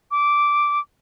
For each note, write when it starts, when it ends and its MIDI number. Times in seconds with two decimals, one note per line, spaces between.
0.11 0.79 86